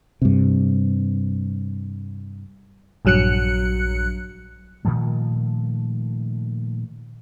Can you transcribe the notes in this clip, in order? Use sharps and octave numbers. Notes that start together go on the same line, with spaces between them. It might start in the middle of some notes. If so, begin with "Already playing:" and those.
G2 C3
A#1 G2 F#3 F#6 C#7
A#2 D#3 F3 A3